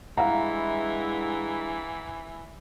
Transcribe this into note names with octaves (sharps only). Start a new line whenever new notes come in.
G2 E3 G#3 E4 F5 F#5 A#5